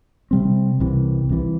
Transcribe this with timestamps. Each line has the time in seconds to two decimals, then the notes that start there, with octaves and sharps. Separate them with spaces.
0.31 C3 G3 C4
0.80 C2 C3 E3
1.29 C2 C3 E3